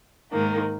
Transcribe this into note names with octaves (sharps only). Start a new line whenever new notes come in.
G#2 D#3 A#3